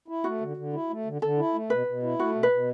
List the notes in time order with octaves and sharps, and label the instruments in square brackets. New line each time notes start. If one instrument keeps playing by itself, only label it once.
[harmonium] E4
[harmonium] A3 [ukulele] F#4
[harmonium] D3
D3
E4
A3
D3
[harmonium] D3 [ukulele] A4
[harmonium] E4
A3
[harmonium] B2 [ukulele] B4
[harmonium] B2
E4
[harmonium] A3 [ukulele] F#4
[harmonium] B2
[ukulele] B4
[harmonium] B2